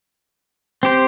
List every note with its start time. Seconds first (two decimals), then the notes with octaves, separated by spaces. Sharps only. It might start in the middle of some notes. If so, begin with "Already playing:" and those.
0.83 C4 G4 C5